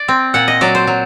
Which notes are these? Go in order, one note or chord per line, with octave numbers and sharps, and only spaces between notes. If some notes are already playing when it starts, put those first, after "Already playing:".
Already playing: D5
C4
A#2 F#5
D#5
F#3 D5
C5
F#3